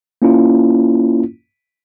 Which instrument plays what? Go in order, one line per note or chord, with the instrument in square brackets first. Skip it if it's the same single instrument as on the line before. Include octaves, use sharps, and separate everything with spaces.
[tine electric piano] A#3 C#4 E4 F4